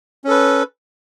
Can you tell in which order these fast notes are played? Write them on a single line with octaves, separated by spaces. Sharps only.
C#4 A4 B4